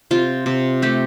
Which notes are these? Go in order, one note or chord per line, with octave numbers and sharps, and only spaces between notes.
C3 F4
C3
A3 G4